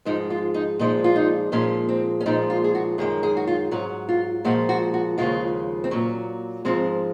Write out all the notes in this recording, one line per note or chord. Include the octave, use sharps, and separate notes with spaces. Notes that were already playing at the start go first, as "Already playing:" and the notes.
G#2 F3 G#3 D#4
F4
D#4
A#2 F3 G#3 D#4
F4
D#4
A#2 F3 G#3 C#4
C4
C#4
A#2 F3 G#3 D#4
F4
G#4
F#4
F#2 D#3 G#3 G#4
G#4
F#4
F4
G#2 F#3 C#4
F4
A#2 F3 G#3 F#4
F#4
F#4
D#2 C#3 F3 G#3 F4
C4
A#2 F#3 C#4
G#2 F3 G#3 C4